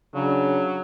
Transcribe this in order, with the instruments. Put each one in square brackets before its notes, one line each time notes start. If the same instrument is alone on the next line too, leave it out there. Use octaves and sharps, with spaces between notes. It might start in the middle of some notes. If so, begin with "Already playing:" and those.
[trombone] C#3 [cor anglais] F#3 [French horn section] D4